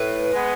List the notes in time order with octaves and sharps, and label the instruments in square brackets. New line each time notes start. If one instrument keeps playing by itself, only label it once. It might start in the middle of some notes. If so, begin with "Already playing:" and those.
Already playing: [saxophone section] A2 [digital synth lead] B4
[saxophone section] G#3 B3